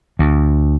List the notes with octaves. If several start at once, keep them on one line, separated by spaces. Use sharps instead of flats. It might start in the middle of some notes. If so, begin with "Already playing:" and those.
D2